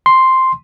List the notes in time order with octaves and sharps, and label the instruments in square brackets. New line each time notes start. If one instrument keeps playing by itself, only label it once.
[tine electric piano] C6